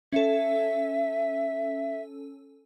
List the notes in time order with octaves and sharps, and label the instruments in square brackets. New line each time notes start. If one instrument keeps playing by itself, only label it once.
[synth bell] C#4 A4 [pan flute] E5